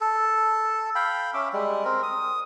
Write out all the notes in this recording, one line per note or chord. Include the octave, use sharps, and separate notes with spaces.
A4
F5 G5 B5
C#4 E5 D6
G3 G#3
C4 A#4
D#6